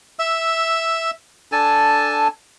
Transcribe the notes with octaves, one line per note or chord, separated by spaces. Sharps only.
E5 E6
D4 A4 G#5 A5